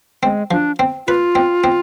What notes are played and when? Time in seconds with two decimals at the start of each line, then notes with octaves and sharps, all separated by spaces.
0.23 G#3 C4
0.51 F3 D4
0.79 C4
1.07 F4 B4
1.35 C4
1.64 C4